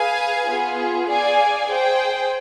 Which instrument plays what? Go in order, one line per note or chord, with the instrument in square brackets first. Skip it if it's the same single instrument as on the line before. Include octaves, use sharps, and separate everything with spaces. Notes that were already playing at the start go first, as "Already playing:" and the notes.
Already playing: [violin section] G#4 B4 F5 G#5
B3 F4 G#4
G#4 D5 F5 G#5
G#4 C5 G5